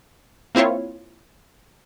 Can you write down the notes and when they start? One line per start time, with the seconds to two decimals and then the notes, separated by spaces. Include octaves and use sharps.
0.55 A#3 C4 E4 F4 C#5